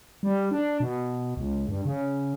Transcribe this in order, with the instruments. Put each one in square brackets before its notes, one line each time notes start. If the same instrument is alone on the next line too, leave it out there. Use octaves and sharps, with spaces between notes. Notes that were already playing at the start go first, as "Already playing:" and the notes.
[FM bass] G3
D4
B2
C#2
G2
C#3